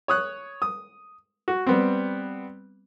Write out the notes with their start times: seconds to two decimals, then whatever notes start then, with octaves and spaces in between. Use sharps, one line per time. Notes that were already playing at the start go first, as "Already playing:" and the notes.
0.08 C#5 D#6 F#6
0.62 D#6
1.48 F#4
1.67 G3 B3 C4